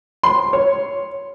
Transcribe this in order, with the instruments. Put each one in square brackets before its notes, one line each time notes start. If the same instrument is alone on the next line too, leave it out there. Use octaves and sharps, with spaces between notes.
[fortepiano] C6
C#5